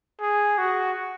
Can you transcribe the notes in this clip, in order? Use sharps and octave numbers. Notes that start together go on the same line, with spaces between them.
G#4
F#4